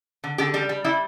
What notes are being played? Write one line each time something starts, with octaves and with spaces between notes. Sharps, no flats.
D3
D3 G4
G3 G4
G3
G3 E4